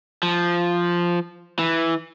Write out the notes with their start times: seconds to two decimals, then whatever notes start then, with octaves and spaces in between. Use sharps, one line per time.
0.23 F3
1.59 E3